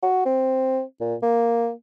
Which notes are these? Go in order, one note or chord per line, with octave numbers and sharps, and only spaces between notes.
F#4
C4
A#2
A#3